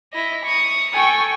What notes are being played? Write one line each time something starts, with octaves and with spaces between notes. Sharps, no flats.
E4 D#5
C#6 D#6
A4 G5 G#5 C#6